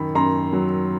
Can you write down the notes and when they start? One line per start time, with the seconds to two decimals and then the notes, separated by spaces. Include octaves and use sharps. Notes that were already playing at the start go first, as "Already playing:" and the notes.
Already playing: F#2 D#3 B5
0.15 F#2 A#5 C6
0.53 F#3